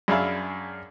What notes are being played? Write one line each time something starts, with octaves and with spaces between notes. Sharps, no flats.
F#2 D4 G#4 E5 F5 B5